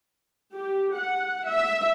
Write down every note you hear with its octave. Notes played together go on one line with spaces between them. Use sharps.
G4
F#5
E5